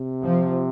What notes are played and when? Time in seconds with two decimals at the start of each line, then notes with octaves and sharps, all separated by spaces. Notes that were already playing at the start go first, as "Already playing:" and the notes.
Already playing: C3
0.24 F3